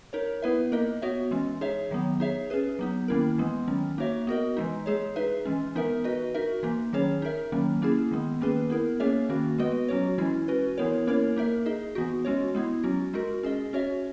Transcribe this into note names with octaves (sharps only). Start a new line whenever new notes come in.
D#4 A#4 C#5
B3 E4 B4 E5
A#3 D#4 A#4 D#5
B3 F#4 C#5 E5
E3 G#3 C#4
D#4 G#4 C#5 E5
D#3 F#3 B3
D#4 G#4 C#5 E5
C#4 G#4 B4
F#3 B3 D#4
D#3 A#3 C#4 E4 A#4
E3 G#3 B3
D#3 F#3 C#4
A#3 D#4 F#4 C#5 E5
B3 F#4 A#4 D#5
E3 G#3 D#4
G#3 D#4 G#4 C#5
D#4 G#4 B4 E5
E3 G#3 C#4
E3 B3 D#4 A#4 E5
D#4 F#4 B4 D#5
D#4 F#4 A#4 E5
E3 A#3 D#4
D#3 F#3 C#4 G#4 C#5
D#4 A#4 E5
D#3 F#3 A#3 C#4
A#3 C#4 E4 G#4
D#3 G#3 B3
D#3 A#3 C#4 G#4 B4
B3 E4 A#4
A#3 C#4 G#4 C#5 E5
D#3 A#3 C#4 F#4
G#3 B3 F#4 B4 D#5
F#3 C#4 F#4 C#5
E3 G#3 C#4 E4
C#4 F#4 B4
E3 B3 E4 A#4 C#5
A#3 C#4 E4 A#4 C#5
A#3 D#4 A#4 E5
D#4 G#4 D#5
E3 B3 D#4 F#4
G#3 C#4 F#4 C#5
G#3 B3 E4
F#3 C#4 F#4
G#3 D#4 F#4 A#4
C#4 G#4 D#5
C#4 F#4 C#5 E5